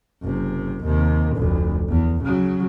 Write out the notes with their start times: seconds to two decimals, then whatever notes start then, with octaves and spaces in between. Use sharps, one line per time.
0.22 F#1 C3
0.84 D#2 C3
1.35 F1 D2
1.89 E2
2.24 C#3 F#3